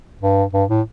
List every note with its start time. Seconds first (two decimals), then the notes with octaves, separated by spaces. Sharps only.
0.21 G2
0.53 G2
0.70 A2